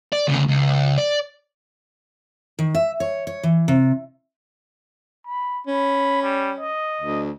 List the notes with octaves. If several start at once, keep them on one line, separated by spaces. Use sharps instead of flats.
D5
D2 C#3
C#2
D5
D#3
E5
C#5
C#5
E3
C3
B5
C#4 B5
G3
D#5
D2